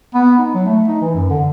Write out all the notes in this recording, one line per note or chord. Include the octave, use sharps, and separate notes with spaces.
B3
D#4
F#3
A3
D#4
E3
F#2
D3